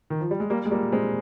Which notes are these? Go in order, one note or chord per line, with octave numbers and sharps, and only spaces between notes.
D#3
F3
G3
G#3
G3 A#3
G#3
G3 A#3
G#3 C4